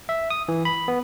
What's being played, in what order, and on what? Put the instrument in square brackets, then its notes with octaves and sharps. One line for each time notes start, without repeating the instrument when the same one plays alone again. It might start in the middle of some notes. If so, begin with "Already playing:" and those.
[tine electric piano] E5
D#6
E3
B5
B3